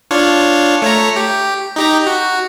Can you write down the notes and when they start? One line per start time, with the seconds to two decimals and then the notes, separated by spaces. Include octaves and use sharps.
0.11 D4 F4 C#5
0.82 A3 C#5 A#5
1.16 G4
1.76 D#4 G4 A#5
2.07 F#4